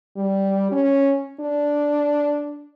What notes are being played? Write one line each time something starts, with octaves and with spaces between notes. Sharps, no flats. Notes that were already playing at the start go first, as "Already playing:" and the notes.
G3
C#4
D4